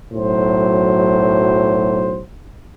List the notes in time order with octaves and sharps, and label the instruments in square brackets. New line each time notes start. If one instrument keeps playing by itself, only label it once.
[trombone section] B1 A2 F#3 C5